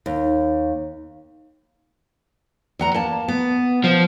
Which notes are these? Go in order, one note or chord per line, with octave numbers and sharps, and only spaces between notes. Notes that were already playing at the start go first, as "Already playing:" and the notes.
D#2
E2 F#5 A#5
A#3 A5
B3
F3